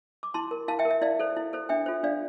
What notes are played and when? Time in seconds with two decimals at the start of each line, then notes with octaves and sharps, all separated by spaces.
0.23 D6
0.34 E4 A5 C6
0.51 A#4
0.68 E4 F5 A5
0.79 E5 G5
0.85 A#4
0.91 E5
1.02 E4 D5 F5
1.19 A4 C5
1.36 E4
1.53 A4 C5
1.69 D4 E5 G5
1.86 F4 A4 C5
2.03 D4 D5 F5